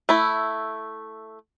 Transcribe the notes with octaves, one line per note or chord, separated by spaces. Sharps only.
A3 E4